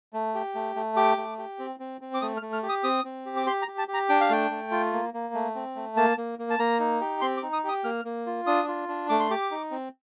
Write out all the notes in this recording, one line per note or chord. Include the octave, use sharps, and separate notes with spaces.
A3
G4
A3
A3
G4 D6
A3
G4
C4
C4
C4
D6
A3 D#6
F6
A3
F6
G4
D#6
C4 D#6
C4
G4
D6
G4 C6
A#5
G4
A5
G4
A#5
D4 G5
F5
A3 G5
A3
F4
A#3
A#3
A3
C4
A3
A#3 A5
A#3
A#3
A5
A#3 A#5
D#4
G4
C4 C6
D6
D#4
D#6
G4 D#6
A#3 F6
A#3
F4
D4 D#6
F4
D4
A3 D6
C6
G4 D6
D#4
C4